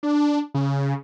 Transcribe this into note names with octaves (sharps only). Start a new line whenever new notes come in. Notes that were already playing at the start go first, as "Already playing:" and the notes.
D4
C#3